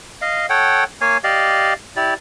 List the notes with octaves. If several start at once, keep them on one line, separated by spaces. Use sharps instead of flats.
D#5 F5
A4 C#5 F#5 G5
A#3 C#5 F5 G#5
G4 D5 D#5 F5
E4 G4 D5